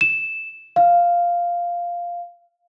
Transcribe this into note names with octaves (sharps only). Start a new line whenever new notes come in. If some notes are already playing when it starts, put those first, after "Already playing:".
E7
F5